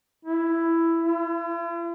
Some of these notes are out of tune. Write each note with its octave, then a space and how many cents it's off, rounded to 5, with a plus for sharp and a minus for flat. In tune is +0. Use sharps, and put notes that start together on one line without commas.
E4 +10
E4 +45